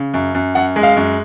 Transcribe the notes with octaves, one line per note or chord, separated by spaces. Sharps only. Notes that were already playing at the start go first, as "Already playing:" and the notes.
Already playing: C#3
F#2
F#2
F#2 F#5
G#3
F5
F#2